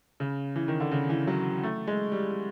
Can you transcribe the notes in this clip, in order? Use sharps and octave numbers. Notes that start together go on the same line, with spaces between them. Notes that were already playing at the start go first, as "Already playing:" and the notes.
C#3
E3
D#3
D3
C#3
E3
F#3
A3
G#3
G3